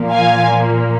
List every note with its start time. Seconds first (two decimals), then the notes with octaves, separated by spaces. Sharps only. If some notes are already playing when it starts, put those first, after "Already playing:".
Already playing: A#2 F3 A#3
0.11 F5 G#5